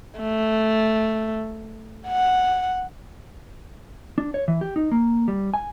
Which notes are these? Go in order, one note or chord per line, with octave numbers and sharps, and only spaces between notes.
A3
F#5
D4
C#5
E3
G4
D#4
A#3
G3
G#5